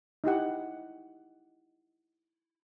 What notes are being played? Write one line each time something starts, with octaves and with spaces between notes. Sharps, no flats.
D#4 E4 G4 F#5